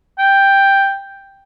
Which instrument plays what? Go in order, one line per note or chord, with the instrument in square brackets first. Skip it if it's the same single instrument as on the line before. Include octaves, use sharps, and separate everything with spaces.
[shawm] G5